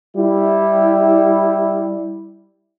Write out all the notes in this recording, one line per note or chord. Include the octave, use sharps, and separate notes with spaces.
G3 E4